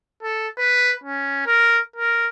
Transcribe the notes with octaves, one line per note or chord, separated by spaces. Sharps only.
A4
B4
C#4
A#4
A#4